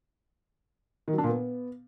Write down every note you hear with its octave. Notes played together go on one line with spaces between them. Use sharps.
D#3
F#3
D4
A#2
B3